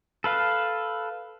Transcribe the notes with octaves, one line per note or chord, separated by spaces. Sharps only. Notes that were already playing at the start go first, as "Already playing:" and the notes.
A4 B4 F5